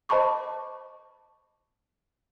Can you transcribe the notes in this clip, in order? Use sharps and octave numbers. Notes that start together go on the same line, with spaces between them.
C5 D#5 A5 B5 C#6 D6